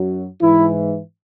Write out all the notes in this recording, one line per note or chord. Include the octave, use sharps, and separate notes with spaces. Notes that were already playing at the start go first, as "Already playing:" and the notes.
Already playing: F#2 F#3
G#2 E3 E4